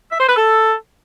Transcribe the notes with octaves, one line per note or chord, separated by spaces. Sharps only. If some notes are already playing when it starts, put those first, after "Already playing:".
E5
C5
B4
A4